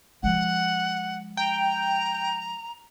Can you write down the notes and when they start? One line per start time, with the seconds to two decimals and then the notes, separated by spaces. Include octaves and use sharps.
0.23 F3 G#3 F#5
1.37 G5 A#5